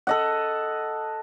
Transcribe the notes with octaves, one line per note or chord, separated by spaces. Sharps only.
A4 D#5 F#5